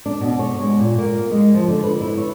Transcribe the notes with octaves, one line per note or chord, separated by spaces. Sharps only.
D4
B2
C#5
G#3
A#2
A#3
G#3
F3
D3
B4
E4
C#5